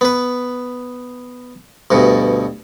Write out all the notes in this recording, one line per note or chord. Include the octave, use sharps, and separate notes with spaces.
B3 B4
D2 G2 B2